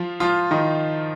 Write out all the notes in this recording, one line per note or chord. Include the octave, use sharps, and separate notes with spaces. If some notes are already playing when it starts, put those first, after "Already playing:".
Already playing: F3 F4
F3 F4
D#3 D#4